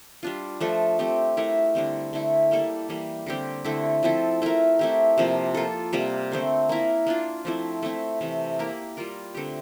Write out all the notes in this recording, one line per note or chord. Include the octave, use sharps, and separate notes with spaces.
G3 D4 F4
F3 A3 D4 A4
A3 C4 G4
A3 E4 A#4
D3 G3 C4
D3 A3 E4
G3 A#3 E4 A4
E3 G3 A#3
D3 G3 C4 G4
D3 A3 C4 E4
F3 C4 E4 A4
A3 E4 A#4
A3 C4 E4 G4
C3 F3 A#3
A#3 F4 A4
C3 G3 A#3 F4
D3 A3 C4
A#3 E4 A#4
A#3 D4 F4
F3 A3 C4 E4
A3 C4 E4
C3 E3 A3
A#3 E4 G4 A#4
G3 A#3 F4 A#4
D3 A3 C4 G4